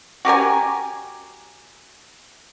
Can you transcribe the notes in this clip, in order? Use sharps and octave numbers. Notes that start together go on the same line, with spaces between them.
F#4 G4 A#4 G#5